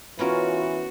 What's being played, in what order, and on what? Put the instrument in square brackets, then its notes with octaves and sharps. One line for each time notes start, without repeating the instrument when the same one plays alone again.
[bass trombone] E3 [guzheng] B3 C#4 A#4 [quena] F4 [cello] F#4